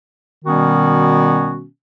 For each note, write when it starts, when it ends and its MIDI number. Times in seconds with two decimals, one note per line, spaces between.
0.45 1.64 47
0.45 1.64 51
0.45 1.64 55
0.45 1.64 59
0.45 1.64 61
0.45 1.64 66